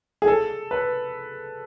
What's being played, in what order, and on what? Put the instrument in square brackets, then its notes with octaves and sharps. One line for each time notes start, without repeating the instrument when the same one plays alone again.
[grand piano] G#4
A4
B4